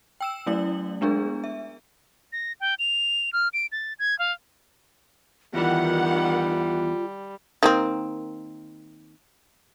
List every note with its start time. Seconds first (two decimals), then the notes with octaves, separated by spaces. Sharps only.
0.21 G5 E6 E7
0.46 F#3 A3 C#4 E4 D5 F#7
1.01 G#3 B3 D4 G#4 A#4
1.44 E5
2.33 A#6
2.60 G5
2.79 F7
3.33 F6
3.53 D7
3.72 A6
3.99 G#6
4.19 F5
5.54 E2 D#3 E3 G3 F4 F#5
7.63 D#3 A#3 C4